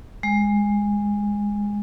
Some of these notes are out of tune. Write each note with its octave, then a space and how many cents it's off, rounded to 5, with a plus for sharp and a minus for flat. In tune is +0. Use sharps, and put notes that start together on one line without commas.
G#3 -15